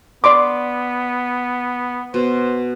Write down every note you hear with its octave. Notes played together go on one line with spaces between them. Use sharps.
B3 D5 C6 D6
B2 C5